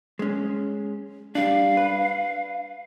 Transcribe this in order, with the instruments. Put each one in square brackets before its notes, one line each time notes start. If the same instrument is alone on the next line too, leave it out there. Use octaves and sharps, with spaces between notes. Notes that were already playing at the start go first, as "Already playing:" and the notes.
[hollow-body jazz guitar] G#3 C#4
[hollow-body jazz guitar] G3 D4 [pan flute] F5
[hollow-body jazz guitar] B4